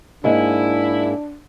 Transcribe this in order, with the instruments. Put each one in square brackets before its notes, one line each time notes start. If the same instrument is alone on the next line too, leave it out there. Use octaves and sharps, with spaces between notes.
[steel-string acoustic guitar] G#2 A#3 G#4 [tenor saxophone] D4 [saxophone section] E4